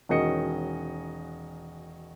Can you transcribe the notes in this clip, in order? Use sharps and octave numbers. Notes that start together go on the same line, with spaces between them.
E1 D#3 C#4 F#4 D#5 C#7